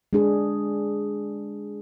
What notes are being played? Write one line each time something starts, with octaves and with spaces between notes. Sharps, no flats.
G#3 D4 G#4